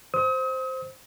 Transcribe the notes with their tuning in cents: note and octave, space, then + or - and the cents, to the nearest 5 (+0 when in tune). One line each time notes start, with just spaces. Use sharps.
C5 +0 D#6 +40